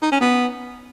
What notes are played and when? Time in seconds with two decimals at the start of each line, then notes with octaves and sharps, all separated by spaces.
0.02 D#4
0.11 C#4
0.21 B3